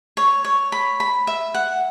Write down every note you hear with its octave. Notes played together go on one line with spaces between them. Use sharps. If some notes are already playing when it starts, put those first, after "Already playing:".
C#5
C#5
B5
B5
E5
F#5